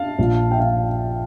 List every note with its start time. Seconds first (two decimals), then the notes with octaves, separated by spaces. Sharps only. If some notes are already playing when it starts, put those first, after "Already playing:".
Already playing: F5 A5
0.19 A#1 A#2
0.51 E5 G5
0.59 F5